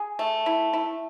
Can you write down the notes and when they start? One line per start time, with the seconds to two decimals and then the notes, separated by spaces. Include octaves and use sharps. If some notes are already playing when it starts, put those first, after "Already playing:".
Already playing: G#4
0.19 A3
0.46 E4
0.73 E4